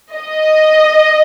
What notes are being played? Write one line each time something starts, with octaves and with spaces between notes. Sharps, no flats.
D#5